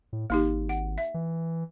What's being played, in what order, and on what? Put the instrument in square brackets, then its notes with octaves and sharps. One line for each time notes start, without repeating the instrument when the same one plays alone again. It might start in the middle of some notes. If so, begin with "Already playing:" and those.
[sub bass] A2
[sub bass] G#1 [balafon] A#3 D#4 G4
[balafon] F#5
E5
[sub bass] E3